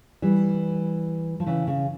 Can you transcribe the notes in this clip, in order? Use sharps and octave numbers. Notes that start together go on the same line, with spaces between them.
E3 G3
F3
C#3 E3
C#3